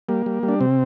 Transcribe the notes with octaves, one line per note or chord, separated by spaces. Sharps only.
G3 A#3
G3
G3
D4
C3 C4